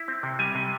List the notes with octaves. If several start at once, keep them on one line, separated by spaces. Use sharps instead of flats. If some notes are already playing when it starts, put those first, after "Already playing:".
Already playing: E4
C4
C3
G3 G#5
C3